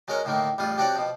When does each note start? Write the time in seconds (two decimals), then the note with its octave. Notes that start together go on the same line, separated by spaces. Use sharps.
0.08 F#3 G#3 C#4 A#4 C#5 D#5
0.25 D2 A2 D3 D#3 A#3
0.58 A1 E2 G3 F4 D#6
0.78 G3 C4 D4 F#4 C#5 D5
0.96 B2 F3